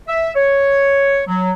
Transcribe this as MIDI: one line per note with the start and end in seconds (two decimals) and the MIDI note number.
0.08 0.31 76
0.36 1.22 73
1.28 1.53 54